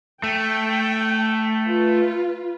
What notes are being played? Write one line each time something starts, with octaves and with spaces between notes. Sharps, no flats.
A3 G5
F4 B4